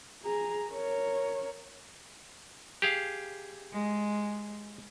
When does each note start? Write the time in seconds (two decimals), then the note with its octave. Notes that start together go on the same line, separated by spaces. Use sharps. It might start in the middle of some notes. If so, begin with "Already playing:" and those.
0.23 G#4 A#5
0.71 A#4 C#5
2.82 G4 G#4 F5
3.73 G#3